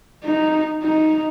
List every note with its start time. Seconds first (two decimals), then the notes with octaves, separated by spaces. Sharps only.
0.24 D#4
0.84 D#4